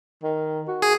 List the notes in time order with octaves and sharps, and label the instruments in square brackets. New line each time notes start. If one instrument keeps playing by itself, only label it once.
[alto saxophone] D#3
F#4
[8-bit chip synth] G#4